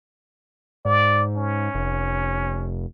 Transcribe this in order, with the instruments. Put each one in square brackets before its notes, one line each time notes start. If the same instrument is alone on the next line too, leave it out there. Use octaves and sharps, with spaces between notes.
[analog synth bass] G#2 [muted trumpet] D5
[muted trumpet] C#4
[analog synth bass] F1